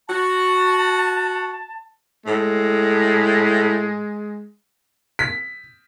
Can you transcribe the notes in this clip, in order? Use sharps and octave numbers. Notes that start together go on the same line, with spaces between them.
F#4 A5
A2 G#3
B6